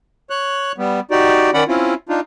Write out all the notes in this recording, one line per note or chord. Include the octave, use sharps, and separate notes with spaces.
C#5 F#6
G3 B3
D#4 F#4 G4 D5
D#3 C#4 D5 F#5 B5
C4 C#4 E4 F4
D4 D#4 F4